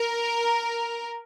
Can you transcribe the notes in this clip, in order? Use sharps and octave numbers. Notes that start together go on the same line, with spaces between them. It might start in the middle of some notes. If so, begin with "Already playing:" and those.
Already playing: A#4